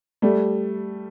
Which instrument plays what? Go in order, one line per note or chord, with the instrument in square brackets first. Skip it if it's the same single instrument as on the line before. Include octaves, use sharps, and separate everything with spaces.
[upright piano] G3 A3